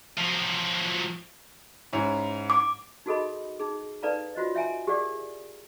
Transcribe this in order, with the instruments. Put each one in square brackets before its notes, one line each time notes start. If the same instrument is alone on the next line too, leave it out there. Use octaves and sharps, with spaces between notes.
[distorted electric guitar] F3 F#3
[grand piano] G#2 C#4 E4
[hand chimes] D6
[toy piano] D#4 F#4 G#4 A4 D#5 B5
D#4 G#4
D#4 A4 B4 D5 F5 A#5
F4 F#4 C5 D#5
C#5 E5 G5 G#5 A#5
G4 G#4 A#4 D5 F#5